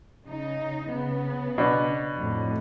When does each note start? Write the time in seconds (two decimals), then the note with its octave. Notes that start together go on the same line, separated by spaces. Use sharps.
0.27 C#3 D#4
0.91 C#3 B3
1.58 B2 D4
2.16 F2 A2